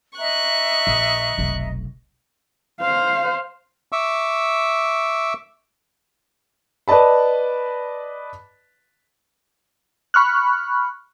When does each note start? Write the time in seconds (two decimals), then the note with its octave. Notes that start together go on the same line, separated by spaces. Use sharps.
0.19 D#5 E5 A#5 C#6 F#6
0.87 A#1
1.38 F1 B1
2.81 C5 F5
3.92 E5 C#6 D6 E6
6.88 B4 D5 D#5 A5 B5
10.14 B5 C#6 F6 F#6